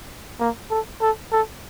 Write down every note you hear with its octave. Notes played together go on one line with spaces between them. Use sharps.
A#3
A4
A4
A4